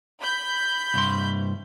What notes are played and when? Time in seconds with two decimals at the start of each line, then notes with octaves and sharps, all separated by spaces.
0.20 B5 G6
0.94 C2 G2 C6